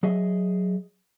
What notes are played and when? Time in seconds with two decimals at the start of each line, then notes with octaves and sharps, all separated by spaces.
0.03 F#3 G#4 D#5 E5